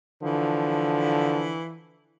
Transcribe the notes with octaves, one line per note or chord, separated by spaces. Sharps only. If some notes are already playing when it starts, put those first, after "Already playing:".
D3 E3 F3